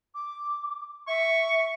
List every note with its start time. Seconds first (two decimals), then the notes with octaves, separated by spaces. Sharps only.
0.15 D6
1.08 E5 C#6